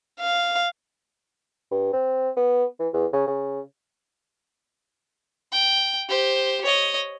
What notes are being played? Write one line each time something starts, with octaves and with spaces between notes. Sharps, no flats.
F5
G2
C4
B3
E3
E2
C#3
C#3
G5
G4 C5
C#5 D#5